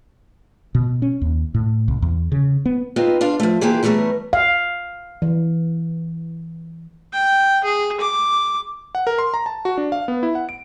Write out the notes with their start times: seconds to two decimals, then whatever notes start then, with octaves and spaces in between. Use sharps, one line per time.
0.75 B2
1.02 C#4
1.22 D#2
1.54 A2
1.88 C2
2.02 E2
2.32 C#3
2.66 B3
2.96 B3 C4 D#4 F4
3.21 D4 F4 F5
3.40 F3 A3
3.61 E3 A#3 F4 G4 G#4
3.83 E3 G3 A3 B3 A#4 C#5
4.33 F5
5.22 E3
7.13 G5
7.64 G#4
8.00 D6
8.95 F#5
9.07 A#4
9.19 C6
9.34 A#5
9.46 A5
9.65 F#4
9.78 D4
9.92 F5
10.08 B3
10.23 E4
10.35 F#5
10.49 D7